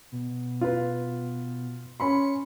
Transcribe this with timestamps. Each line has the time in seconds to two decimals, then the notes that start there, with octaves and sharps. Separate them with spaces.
0.12 B2
0.61 F4 B4
2.00 C#4 B5 C6 C#7